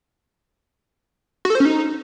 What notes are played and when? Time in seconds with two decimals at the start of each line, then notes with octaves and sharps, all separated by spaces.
1.45 F#4
1.50 A4
1.55 C5
1.60 C#4
1.65 D#4